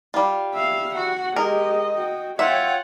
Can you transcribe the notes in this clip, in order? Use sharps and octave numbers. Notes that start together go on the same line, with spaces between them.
G3 F4
E5 F5
F#4 F#5
G#3 G4 A#4 D#5
F#4 G5
F4 C#5 E5 F#5 G5